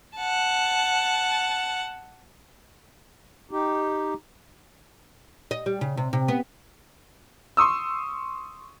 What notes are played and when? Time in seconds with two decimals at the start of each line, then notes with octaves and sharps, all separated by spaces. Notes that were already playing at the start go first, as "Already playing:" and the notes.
0.17 F#5 A5
3.51 D#4 G4
5.51 D#5
5.66 G3
5.81 C#3
5.97 C3
6.13 C3
6.28 B3
7.57 C6 C#6 D#6 E6